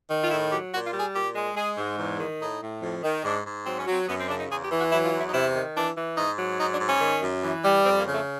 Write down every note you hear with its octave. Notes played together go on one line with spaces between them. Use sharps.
D#3
F4
A2 E4
F#3 G4
A#2 F#4
F4
G3
G#4
A#2 G4
G#3
G#3 G#4
G#2
E2
D#3
A2 D#4
A2
F2
D#3
G#2 D4
G#2
F#3 C4
C#4
F#3 C4
F#2 B3
C4
C#3 D4
D#4
E2 G#4
G4
E3
F#4
F#3 E4
F4
E2
E4
D#4
C3 E4
D#3
E3 D4
E3
G#2 D#4
F#3
G#2 D#4
D4
G#2
C#4
D#3
F#2
E3
G3
F2 C4
A#3
C#3
A3